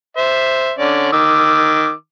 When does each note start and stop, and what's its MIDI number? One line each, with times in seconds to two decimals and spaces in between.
0.17 0.72 72
0.17 0.72 76
0.79 1.10 50
0.79 1.10 61
0.79 1.10 74
1.12 1.92 51
1.12 1.92 86
1.12 1.92 88